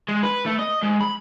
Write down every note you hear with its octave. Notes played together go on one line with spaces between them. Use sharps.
G#3
B4
A3
D#5
G#2
B5